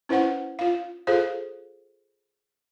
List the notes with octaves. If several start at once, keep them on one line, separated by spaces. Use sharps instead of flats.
C#4 E4 B4 C5 F#5
F4 F5
F4 G#4 A4 C5 F5